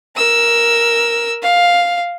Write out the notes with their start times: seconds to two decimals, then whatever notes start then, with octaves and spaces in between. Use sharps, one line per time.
0.16 A#4 E6
1.43 F5